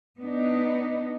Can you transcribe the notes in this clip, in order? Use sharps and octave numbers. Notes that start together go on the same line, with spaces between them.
B3 D4 D#4